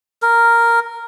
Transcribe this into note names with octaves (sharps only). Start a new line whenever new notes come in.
A#4